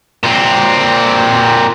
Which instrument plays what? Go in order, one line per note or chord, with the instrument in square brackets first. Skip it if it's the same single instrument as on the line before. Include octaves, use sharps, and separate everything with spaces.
[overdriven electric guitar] A#2 C4